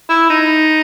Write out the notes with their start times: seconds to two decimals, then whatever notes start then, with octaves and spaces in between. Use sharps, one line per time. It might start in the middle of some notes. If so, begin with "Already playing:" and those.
0.09 E4
0.30 D#4